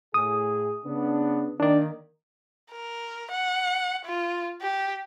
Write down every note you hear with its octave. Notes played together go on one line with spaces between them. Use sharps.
A2 G#4 D#6
C#3 B3 D4
D#3 A#3 D4 D5
A#4
F#5
F4
G4